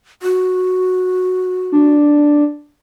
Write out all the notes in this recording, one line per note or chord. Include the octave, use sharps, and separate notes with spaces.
F#4
D4